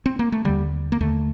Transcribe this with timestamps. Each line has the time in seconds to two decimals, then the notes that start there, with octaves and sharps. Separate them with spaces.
0.06 C4
0.19 A#3
0.32 A3
0.45 D#2 D3 G3
0.92 A#3
1.00 D#2 D3 A3